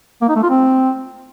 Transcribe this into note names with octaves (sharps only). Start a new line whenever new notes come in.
A#3
D#4
A3
F4
C4